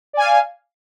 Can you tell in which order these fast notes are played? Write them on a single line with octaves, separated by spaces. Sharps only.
D5 G#5 F5